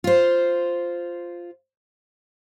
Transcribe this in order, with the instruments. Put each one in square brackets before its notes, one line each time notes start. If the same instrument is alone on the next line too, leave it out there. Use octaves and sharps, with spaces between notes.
[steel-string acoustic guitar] F4 C5